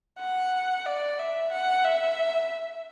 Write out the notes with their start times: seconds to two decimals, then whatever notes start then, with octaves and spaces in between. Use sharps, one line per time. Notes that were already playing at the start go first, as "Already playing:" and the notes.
0.20 F#5
0.86 D5
1.19 E5
1.52 F#5
1.85 E5